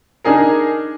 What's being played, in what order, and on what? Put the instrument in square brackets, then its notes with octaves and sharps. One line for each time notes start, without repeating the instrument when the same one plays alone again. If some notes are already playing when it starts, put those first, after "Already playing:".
[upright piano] D4 D#4 G#4 A#4